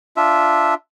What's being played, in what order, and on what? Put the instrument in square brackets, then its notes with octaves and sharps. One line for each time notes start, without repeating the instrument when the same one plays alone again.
[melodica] D4 F4 E5